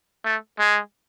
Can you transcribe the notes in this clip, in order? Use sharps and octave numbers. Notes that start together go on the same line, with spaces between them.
A3
G#3